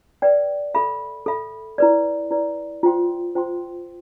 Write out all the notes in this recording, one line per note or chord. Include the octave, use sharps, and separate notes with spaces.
B4 D5 G5
A4 E5 B5
A4 E5 B5
E4 B4 D5
E4 B4 D5
F4 C5 G5 C6
F4 C5 G5 C6